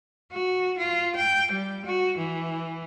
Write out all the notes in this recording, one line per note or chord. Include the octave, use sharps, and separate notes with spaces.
F#4
F4
G5
G3
F#4
E3